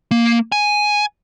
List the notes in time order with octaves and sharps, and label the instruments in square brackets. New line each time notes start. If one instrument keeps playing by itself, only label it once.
[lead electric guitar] A#3
G#5